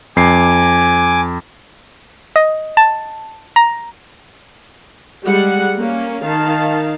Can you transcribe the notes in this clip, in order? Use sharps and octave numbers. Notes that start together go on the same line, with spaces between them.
F2 G#5 D6 C7
D#5
A5
A#5
G3 G#3 F#5
A#3 C#4
D#3 F5 A5